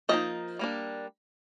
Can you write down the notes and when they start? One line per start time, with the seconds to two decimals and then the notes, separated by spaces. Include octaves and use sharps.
0.09 F3 A#3 D#4 D#5
0.59 G3 A#3 D4